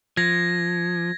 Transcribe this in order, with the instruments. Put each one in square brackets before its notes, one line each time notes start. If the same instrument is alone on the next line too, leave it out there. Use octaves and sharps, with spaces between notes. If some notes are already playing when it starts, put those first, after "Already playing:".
[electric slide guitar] F3 [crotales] G#6 A#6